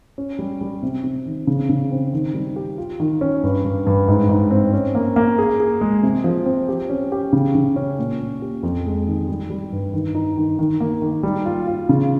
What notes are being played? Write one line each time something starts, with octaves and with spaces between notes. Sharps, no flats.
C#4
G3
G3
C3
C3
D#3
C#3
C#3
C4
D#3
G3
G4
F4
D#3
C#4
G2
G2
G2
G#2
G#2
C4
C#4
A#3
A#3
G#4
G#4
G#3
C3
F3
C4
G4
C#4
G4
C#3
C#3
C#4
A#2
A#2
G4
F2
G#3
D#3
G3
G3
G2
D#3
D#4
D#3
D#3
A#3
D#3
G3
F4
F4
C#3